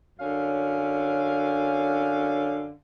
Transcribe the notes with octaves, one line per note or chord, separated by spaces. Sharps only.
F#2 D3 C#4 F5